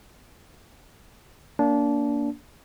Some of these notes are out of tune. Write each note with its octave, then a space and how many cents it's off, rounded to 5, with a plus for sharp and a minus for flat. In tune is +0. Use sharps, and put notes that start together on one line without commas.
A#3 +0 D4 -25